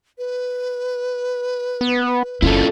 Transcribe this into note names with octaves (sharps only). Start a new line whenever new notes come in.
B4
B3
F#1 C#4 E4 F4 A4